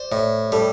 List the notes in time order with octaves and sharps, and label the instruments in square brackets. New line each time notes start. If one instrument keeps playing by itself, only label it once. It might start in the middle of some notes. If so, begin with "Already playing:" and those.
Already playing: [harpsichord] C5 [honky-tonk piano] D5
[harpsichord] A2 [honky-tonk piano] D5
[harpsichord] G3 [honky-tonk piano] A4